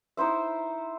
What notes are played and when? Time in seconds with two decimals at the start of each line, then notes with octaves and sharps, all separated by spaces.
0.17 D#4 E4 C5 E5